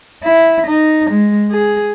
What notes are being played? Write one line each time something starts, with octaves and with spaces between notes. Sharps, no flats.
E4
D#4
G#3
G#4